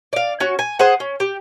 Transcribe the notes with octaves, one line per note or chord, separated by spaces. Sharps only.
D5 F5
C#4 F#4
G#5
G#4 C5 F#5
C#4
G4